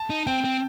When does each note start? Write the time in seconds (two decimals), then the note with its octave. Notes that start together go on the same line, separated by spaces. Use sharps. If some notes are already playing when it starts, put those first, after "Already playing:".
Already playing: A5
0.10 D#4
0.27 C4 G5
0.44 C4